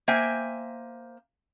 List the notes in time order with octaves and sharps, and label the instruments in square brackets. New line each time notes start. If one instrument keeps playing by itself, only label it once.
[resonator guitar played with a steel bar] A#3 C5 E5 G5 G#5